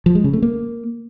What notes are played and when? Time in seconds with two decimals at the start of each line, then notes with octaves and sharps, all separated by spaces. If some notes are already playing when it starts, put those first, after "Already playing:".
0.06 F3
0.15 G#3
0.24 C#3
0.33 A3
0.42 A#3